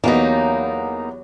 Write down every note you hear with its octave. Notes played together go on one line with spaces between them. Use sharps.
E2 F#3 A#3 B3 D#4 G4